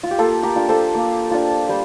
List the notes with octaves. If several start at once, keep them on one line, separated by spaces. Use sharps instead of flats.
F4
G4
A#3 F4 A4
G4 A#4
D4 F4
A4 C5
A#3
D4 F4
G3 C5